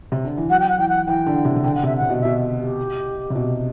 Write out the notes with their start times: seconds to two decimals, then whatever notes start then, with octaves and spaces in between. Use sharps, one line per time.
0.12 C3
0.25 D3
0.37 E3
0.49 F#3 F#5
0.60 G5
0.69 F#5
0.78 E3 G5
0.89 F#5
1.07 E3 G5
1.27 D3
1.45 C3
1.56 C3
1.64 D3 G5
1.75 F#5
1.83 C3
1.86 E5
1.97 C3 F#5
2.10 B2
2.21 B2 E5
2.59 G4
3.30 C3
3.35 B2